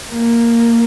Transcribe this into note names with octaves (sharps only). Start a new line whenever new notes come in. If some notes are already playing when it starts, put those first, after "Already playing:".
A#3